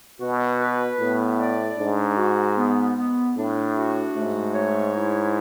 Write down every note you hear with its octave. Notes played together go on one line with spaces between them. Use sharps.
B2 F#4
B4
A2 B3
D5
G#2 D4
F#4
B3
B3
A2 D4
F#4
G#2 A3
C#5
E4